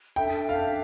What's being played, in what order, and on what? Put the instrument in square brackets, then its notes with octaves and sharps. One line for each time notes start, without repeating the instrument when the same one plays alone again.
[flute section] D4 A4 E5 [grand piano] G5
[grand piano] F5